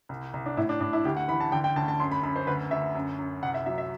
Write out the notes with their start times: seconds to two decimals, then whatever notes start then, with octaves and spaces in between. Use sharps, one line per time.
0.09 C2
0.34 C2
0.46 D4
0.57 A2 E4
0.69 D4
0.81 A2 D4
0.93 E4
1.05 D2 G4
1.17 F#5
1.28 E3 B5
1.40 A5
1.52 D3 G5
1.64 G5
1.76 D2 A5
1.88 A5
2.00 F#2 C6
2.12 B5
2.23 F#2 B5
2.36 C5
2.47 D2 B4
2.71 D2 E5
2.95 F#2
3.18 F#2
3.43 C2 F#5
3.54 E5
3.66 F#3 E5
3.78 E5